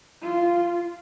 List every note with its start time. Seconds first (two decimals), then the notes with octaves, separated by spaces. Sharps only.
0.22 F4